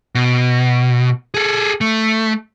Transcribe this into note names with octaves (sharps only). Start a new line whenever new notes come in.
B2
G#4 A4
A3